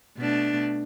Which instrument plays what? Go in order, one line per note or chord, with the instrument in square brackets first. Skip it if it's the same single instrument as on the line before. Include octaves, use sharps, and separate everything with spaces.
[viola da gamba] B2 A3 D4